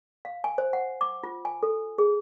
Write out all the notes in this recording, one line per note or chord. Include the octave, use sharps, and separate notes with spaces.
F5
G#5
C5
F#5
D6
F4
G#5
A4
G#4